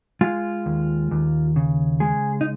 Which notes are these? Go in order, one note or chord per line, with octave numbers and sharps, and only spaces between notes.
G#3 F4
D#2
D#2
C#3
G#3 G#4
D#4